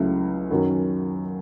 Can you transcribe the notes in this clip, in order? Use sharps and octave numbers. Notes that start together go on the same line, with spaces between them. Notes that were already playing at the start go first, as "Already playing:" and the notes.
Already playing: C#2 C#3 F#3 A3 E4
F#2 D#3 F#3 C#4